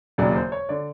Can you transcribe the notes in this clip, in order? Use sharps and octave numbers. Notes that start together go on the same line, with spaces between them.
E1 D#2 C#3 F#3 D5
C5
C#5
D3 D5